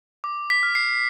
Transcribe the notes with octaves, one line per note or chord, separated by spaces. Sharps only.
D6
B6
F6
C7